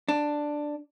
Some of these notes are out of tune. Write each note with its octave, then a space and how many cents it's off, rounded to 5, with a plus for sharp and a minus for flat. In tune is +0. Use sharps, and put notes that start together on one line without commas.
D4 +5